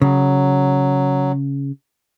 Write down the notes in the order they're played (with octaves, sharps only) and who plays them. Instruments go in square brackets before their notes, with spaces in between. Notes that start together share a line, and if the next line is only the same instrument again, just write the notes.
[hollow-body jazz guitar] C#3 [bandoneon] F#3